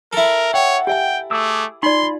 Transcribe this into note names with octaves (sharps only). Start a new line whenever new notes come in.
E4 A4 A#4
C#5 F#5 G5
G4 E5 G5 G#5
A3 G#4 D6 E6
D#4 F4 D5 B5 C6